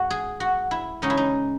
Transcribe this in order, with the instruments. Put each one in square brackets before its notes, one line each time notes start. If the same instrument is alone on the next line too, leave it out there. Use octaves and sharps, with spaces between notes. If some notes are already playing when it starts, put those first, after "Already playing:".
Already playing: [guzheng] G#2 F#4
G#4
F#4
E4
C#3 G#3 C#4 D#4
E4
D#4